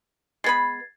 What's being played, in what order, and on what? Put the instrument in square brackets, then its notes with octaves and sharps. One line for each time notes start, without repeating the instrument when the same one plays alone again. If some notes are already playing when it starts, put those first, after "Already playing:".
[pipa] G#3 B3 B5 [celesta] G#6 A6 C7